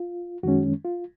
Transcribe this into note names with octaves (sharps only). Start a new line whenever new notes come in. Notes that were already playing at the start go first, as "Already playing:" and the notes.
Already playing: F4
F#2 D#3 G#3 C#4 F#4
F4